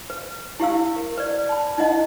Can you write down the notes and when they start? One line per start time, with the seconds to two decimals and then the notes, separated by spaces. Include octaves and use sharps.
0.10 B4
0.60 E4 G4 F5 E6
0.96 A#4
1.18 B4 D5
1.49 A5 B5
1.78 D#4 E4 D#5 F#5